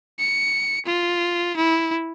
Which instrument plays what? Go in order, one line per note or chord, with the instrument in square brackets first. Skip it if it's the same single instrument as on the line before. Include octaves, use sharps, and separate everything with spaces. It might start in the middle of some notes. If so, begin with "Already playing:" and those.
[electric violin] C#7
F4
E4